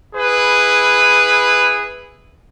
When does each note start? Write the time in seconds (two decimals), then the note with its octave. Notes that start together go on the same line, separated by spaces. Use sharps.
0.14 E4 G#4 B4